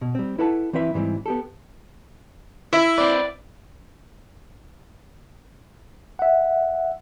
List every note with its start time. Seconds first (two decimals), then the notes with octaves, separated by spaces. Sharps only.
0.01 B2
0.15 G3 C4
0.38 E4 A4 B4 F#5 A5
0.73 E3 C4 E4 B4 E5
0.94 G#2 E3 G3 C4
1.26 B3 G4 A4
2.73 E4 E5
2.98 C4 B4 D5
6.19 E5 F#5